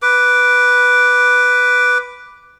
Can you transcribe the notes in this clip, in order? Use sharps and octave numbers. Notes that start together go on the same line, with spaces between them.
B4 D6